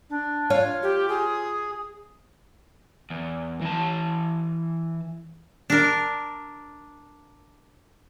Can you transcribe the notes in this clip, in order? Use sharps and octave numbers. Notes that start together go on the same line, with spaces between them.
D4
F4 C#5 F5
G4
G#4
E2
E3 A5
D4 A#4